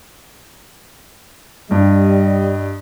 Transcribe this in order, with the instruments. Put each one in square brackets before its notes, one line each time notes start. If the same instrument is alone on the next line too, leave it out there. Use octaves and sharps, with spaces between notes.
[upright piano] G2 [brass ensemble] G3 D#5